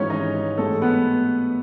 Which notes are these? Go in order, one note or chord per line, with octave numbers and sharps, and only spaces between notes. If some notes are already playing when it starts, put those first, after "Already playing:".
Already playing: G#1 G#2 E3 G#3 C#4 C#5
D#4 D#5
A1 A2 G#3 A4
B3 B4